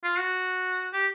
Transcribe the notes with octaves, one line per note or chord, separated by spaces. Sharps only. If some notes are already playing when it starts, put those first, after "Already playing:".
F4
F#4
G4